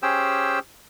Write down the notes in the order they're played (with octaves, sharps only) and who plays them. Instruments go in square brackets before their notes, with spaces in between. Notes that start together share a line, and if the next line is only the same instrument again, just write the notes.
[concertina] C#4 G4 G#4 C5 G5 E6